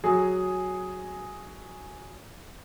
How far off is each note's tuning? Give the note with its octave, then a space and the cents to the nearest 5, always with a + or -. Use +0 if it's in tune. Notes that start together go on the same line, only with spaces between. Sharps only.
F#3 +0 G#4 +0